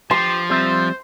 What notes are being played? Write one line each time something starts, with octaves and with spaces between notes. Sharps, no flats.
F3 G4 C6
G3 C4 C5 E5